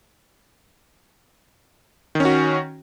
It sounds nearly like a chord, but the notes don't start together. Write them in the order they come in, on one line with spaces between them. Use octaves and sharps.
D#3 C#4 F#4